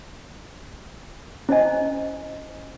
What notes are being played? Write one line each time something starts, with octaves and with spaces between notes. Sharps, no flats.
C#4 E4 C5 D#5 G#5